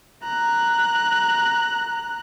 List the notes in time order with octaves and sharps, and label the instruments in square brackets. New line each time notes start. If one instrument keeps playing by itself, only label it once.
[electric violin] A#5 F#6